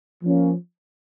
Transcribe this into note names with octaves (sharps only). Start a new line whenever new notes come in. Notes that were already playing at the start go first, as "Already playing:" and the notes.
F3 A#3 C#4